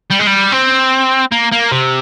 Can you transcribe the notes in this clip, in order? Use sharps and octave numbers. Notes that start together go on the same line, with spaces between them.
G3
G#3
G3
C4
A#3
A#3
C3